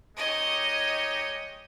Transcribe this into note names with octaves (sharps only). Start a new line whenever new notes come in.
G#3 D#4 G4 C#5 D#5